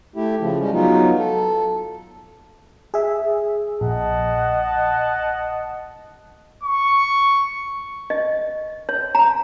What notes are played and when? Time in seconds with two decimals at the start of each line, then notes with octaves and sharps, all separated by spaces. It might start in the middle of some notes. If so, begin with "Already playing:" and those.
0.16 A3 E4 G4
0.41 C#3 F3
0.59 G3 G#3 C#4
0.73 F#3 B3 D#4 F4
1.19 A4
2.94 G#4 E5
3.81 A#1 D#5 F#5 A5
6.63 C#6
8.10 D#5
8.89 C#5
9.15 A#5